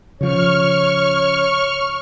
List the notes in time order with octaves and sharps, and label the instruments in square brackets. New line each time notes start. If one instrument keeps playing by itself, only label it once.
[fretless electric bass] C#3 F3 [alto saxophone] C#5 [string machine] C#6 F6